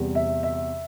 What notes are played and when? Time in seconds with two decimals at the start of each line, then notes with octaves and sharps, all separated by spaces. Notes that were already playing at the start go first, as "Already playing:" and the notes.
Already playing: E2 C3 G3
0.15 E5
0.43 E5